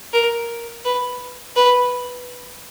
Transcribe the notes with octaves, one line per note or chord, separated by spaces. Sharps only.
A#4
B4
B4